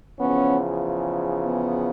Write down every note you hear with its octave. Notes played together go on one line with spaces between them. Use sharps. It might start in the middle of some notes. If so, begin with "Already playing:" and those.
E2 C#3 F3 B3 C#4
B3